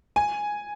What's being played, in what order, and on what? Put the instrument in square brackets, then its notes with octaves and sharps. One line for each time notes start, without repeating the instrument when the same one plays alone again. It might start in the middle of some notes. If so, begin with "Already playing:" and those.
[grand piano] G#5